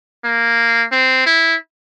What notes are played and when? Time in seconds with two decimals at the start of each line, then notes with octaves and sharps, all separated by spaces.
0.25 A#3
0.92 C4
1.26 E4